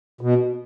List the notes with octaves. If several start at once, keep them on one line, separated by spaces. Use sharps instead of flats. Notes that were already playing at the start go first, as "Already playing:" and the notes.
B2